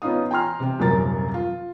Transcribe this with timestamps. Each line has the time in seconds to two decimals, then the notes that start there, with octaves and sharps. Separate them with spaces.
0.02 B3 C#4 D#4 F4 D#6
0.31 G5 G#5 A#5 C6 F6
0.60 C3 C4
0.79 D#1 F#2 C3 A#4 A6
1.34 F4